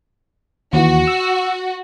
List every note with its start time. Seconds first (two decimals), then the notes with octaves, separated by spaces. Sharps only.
0.73 D#2 E3 F#4
1.07 E6